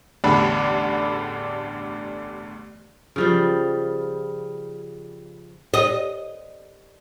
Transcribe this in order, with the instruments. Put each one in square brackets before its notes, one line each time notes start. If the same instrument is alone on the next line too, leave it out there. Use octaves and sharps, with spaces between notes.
[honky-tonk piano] A1 E2 G2 D3 D4 B5
[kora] C#3 F3 G3
[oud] D#5